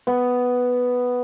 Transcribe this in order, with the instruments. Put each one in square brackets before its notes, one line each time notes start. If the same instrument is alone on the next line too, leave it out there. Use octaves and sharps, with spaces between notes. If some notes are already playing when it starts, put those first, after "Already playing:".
[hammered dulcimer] B3